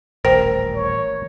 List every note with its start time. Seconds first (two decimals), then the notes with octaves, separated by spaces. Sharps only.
0.25 D#1 A1 A#4 C5 G5
0.75 C#5